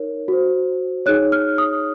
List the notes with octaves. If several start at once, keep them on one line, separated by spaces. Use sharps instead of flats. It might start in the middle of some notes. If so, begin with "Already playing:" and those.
Already playing: D#4 A#4 C#5
F#4 C5
D#4 G#4 C#5 F#6
F6
D#6